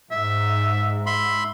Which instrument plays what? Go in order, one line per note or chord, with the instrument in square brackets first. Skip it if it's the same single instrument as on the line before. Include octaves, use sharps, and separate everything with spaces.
[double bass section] G#2 [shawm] E5
[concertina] E5 B5 C6